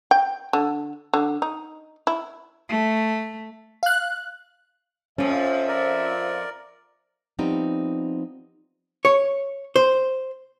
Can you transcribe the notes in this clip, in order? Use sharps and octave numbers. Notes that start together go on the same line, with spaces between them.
G5
D3
D3
D#4
E4
A3
F5 F#6
F2 F3 C#4 C5 E5
A#4 D5
F3 G3 B3 C4 D#4
C#5
C5